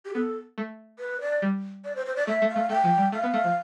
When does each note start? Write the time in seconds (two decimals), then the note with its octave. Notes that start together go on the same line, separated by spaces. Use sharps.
0.05 G4
0.14 B3 A4
0.58 A3
0.99 B4
1.21 D5
1.42 G3
1.85 D5
1.96 C5
2.06 C5
2.16 D5
2.27 A3 E5
2.42 A3
2.49 F5
2.56 A3
2.69 A3 G5
2.84 F3
2.98 G3
3.12 A3 F5
3.24 B3
3.34 A3
3.44 F3